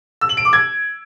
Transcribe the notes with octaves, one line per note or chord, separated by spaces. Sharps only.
E6
F#7
D7
D6
G#6